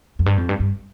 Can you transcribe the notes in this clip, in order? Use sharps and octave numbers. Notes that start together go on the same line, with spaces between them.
F2
G2
F2
G2
G2